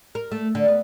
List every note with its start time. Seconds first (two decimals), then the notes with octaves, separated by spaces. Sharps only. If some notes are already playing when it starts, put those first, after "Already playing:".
0.15 A#4
0.32 A3
0.55 D3
0.68 B3